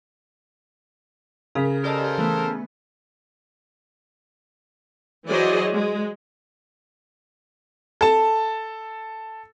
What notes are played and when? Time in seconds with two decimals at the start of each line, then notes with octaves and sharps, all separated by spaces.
1.55 C#3 A#4 B6
1.84 G4 A4 A#4 C5 D5 D#5
2.18 E3 A3 B3
5.28 E3 F#3 G#4 C5 D5 D#5
5.73 G#3
8.01 A4 A5